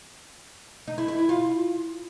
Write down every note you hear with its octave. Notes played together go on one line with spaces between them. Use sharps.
D#4
E4
E4
E4
F4